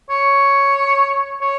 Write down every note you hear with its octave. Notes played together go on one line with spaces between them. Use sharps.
C#5
C#5